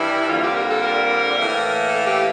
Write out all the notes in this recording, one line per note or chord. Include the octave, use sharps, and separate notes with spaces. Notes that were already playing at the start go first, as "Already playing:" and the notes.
Already playing: G2 E3 G3 E4
F2 D3 G3 A#3 F4
G4
A#4
A4
A#4
A2 E3 A#3
A4
G4